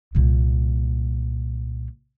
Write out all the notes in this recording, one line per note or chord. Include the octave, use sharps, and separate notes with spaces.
C2 A#2